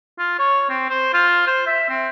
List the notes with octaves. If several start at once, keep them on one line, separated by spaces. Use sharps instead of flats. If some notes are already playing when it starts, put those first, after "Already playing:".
F4
C#5
C4
C5
F4
C5
E5
C4